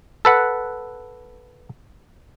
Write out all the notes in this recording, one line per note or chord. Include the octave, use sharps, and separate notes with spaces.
A4 B4 F#5